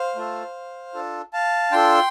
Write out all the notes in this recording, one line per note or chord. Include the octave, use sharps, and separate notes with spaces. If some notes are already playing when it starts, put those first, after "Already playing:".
Already playing: C5 F5
A3 F4 A4
D4 F4 A4
F5 A5
D4 F4 A4 G5 C6